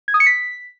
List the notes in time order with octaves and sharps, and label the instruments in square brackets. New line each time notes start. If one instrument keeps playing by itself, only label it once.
[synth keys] G#6
D#6
C#7
B6